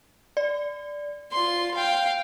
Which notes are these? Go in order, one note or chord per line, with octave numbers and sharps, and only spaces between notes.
D5
F4 C6
F5 G5